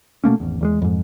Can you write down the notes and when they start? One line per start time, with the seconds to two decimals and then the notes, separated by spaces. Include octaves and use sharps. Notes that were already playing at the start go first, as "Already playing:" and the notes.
0.24 B2 A3 A#3 C#4
0.40 G#1 E2
0.61 E2 G3 G#3
0.82 F2 G#2